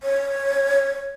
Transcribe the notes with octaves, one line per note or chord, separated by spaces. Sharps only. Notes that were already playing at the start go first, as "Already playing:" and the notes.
C#5